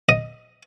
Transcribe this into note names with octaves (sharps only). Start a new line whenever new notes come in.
D#5